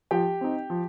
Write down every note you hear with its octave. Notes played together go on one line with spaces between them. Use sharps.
F3 G4 G5
C4 D#4
F3